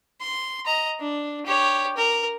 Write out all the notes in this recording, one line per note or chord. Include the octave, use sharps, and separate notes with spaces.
C6
D#5 A#5
D4
G4 C#5
A#4